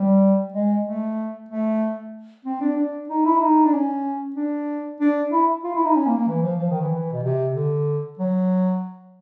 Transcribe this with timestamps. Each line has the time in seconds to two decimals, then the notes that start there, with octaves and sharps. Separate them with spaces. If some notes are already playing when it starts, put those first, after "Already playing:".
Already playing: G3
0.54 G#3
0.85 A3
1.49 A3
2.45 C4
2.61 D4
2.77 D4
3.09 D#4
3.25 E4
3.41 D#4
3.65 D4
3.73 C#4
4.36 D4
5.00 D4
5.33 E4
5.64 F4
5.75 E4
5.85 D#4
5.96 C#4
6.07 A#3
6.17 A#3
6.27 E3
6.43 F3
6.59 F3
6.70 D#3
6.81 E3
6.91 E3
7.12 B2
7.24 C3
7.55 D3
8.19 F#3